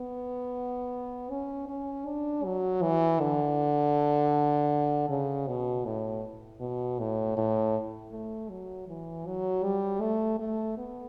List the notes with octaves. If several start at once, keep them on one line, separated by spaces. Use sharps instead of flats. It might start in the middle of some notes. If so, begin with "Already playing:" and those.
Already playing: B3
C#4
C#4
D4
F#3
E3
D3
C#3
B2
A2
B2
A2
A2
A3
F#3
E3
F#3
G3
A3
A3
B3